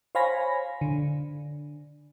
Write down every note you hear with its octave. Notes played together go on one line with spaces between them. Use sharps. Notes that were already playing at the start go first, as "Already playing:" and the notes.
C5 C#5 F5 G#5 B5 A#6
D3